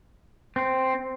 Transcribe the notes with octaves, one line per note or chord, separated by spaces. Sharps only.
C4